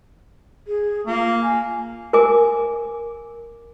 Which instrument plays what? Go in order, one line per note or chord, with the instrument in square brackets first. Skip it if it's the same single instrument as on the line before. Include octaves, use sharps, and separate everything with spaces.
[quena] G#4
[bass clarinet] A#3 [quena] F4
[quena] G#5
[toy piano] A#4 G#5 D6